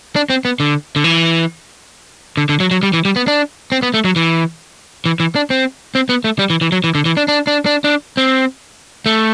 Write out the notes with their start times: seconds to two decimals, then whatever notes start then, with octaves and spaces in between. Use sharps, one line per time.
0.16 D4
0.30 C4
0.45 B3
0.60 D3
0.96 D3
1.04 E3
2.37 D3
2.49 D3
2.60 F#3
2.71 F#3
2.83 G3
2.93 E3
3.05 G3
3.16 B3
3.27 D4
3.72 C4
3.83 B3
3.94 A3
4.05 F#3
4.16 E3
5.06 E3
5.20 E3
5.36 D4
5.50 C4
5.95 C4
6.09 B3
6.24 A3
6.39 G3
6.50 E3
6.61 E3
6.72 F#3
6.84 E3
6.95 D3
7.05 E3
7.17 D4
7.28 D4
7.47 D4
7.66 D4
7.84 D4
8.17 C4
9.06 A3